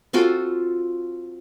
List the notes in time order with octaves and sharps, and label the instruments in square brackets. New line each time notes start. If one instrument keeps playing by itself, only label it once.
[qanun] C4 F4 F#4 A4